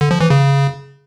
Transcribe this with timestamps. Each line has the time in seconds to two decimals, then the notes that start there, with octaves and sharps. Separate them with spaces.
0.01 D3
0.11 F3
0.21 E3
0.30 C#3